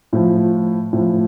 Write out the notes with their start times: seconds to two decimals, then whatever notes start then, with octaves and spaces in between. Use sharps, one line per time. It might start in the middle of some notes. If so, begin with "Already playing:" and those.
0.13 A2 F3
0.93 A2 F3